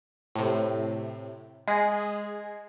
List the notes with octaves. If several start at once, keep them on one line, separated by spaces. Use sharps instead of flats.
A2 C3
G#3 G#4